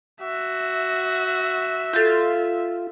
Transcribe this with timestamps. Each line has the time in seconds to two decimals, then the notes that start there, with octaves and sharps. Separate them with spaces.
0.21 F#4 E5
1.93 F4 A4 G6